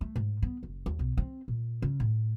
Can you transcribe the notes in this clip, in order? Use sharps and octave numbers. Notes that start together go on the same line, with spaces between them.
A3
G#2
B3
F#1
D#2
B1
C4
A#2
C#3
A2